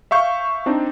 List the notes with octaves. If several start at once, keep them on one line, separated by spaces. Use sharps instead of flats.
E5 F5 C#6 G6
C4 D4 D#4